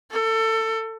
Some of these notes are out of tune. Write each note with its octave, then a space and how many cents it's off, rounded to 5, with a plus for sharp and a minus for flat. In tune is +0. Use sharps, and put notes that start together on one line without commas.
A4 +25